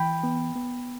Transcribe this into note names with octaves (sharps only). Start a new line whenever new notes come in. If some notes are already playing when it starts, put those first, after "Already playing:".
Already playing: E3 G5 B5
B3
B3